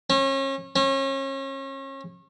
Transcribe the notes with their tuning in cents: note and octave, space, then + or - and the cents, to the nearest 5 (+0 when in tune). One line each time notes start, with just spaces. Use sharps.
C#4 -35
C#4 -35